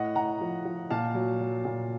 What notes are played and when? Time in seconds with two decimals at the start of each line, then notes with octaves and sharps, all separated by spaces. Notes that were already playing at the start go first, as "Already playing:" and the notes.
Already playing: A2 D#5 F#5
0.15 A2 F#5 A#5
0.41 F3
0.65 F3
0.90 A#2 F5 A5
1.15 F#3
1.40 F#3
1.65 A#2